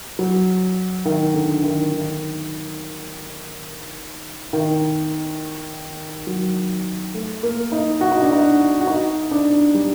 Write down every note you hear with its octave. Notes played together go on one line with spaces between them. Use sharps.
F#3
D#3
D3
D#3
D#3
D#3
F#3
A3
A#3
D#4
F#4
D#4
D4
D#4
F#4
D#4
D4
G3